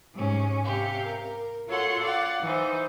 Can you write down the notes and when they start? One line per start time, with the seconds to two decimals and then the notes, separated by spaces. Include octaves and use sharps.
0.14 G#2 C3 C#4
0.63 C3 G4 F5
1.06 A#4
1.69 F4 F#4 A4 C#5 F#5 C6
2.03 D5 F5 F#5
2.42 E3 D#4 C5